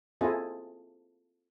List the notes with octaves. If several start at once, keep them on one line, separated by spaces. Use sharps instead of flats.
C4 E4 F4 G#4 A4 D#5